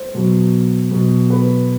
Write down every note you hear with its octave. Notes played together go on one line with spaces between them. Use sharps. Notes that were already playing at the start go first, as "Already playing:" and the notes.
Already playing: C5
B2 F#3
B2 F#3
B4